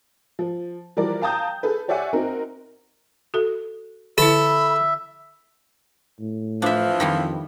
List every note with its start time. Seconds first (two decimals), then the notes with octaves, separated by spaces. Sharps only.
0.39 F3
0.97 E3 F3 G3 F#4 A#4 D5
1.22 F5 G5 A5 A#5 D#6 G6
1.63 G#4 A4 B4
1.88 G4 C#5 D5 E5 F#5 G#5
2.13 C4 D#4 F#4 A#4
3.34 F#4 A4
4.18 D3 E4 A4 E5 B5
6.20 A2
6.62 E3 F3 D4 E5
7.00 F2 D#3 G3 E4